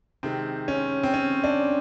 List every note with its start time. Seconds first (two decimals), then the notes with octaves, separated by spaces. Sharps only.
0.23 C3 D#3 G#3 C4
0.68 C#4
1.03 C4
1.14 C#4
1.44 D4